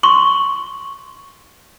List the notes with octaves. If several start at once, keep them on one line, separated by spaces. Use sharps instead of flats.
C6 C#6